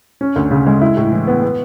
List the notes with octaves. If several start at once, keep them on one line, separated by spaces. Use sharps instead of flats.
C#4
D2
C#3
G#3
E4
A2
E3
B3
B3